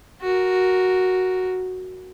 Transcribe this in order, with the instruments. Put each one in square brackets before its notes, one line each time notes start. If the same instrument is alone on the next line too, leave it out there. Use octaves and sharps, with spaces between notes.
[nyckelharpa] F#4 A#4